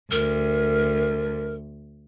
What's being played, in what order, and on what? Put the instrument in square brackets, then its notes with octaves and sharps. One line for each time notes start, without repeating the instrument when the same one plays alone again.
[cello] D2 [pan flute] A#4